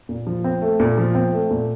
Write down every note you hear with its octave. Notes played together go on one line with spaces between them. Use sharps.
A#2
F3
C4
A3
A#2
F3
C4
A3
A#2